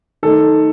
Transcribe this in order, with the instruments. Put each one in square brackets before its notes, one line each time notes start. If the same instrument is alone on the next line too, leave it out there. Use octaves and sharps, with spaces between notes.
[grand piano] D#3 A3 D#4 A4